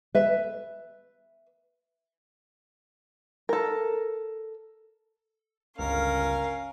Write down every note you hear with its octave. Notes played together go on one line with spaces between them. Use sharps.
B4 E5
A4 A#4
G1 C#2 C#4 A#4 F5 F6